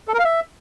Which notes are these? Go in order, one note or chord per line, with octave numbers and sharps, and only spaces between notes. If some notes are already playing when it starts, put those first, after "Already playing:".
A4
A#4
F5
E5